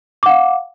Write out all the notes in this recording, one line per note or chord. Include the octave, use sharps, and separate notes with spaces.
F5 F#5 D6